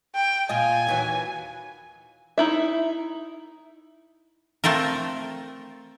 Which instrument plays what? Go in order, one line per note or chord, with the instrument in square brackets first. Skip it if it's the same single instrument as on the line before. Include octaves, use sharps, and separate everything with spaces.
[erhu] G5
[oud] A#2 F4 D#5 [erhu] G#5
[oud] D#2 E3 F#3
[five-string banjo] D#4 E4 E5
[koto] A3 C4 F4 A4 A#4